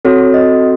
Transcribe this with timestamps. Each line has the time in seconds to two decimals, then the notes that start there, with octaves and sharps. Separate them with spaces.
0.05 C4 F#4 A4 C#5
0.34 D#5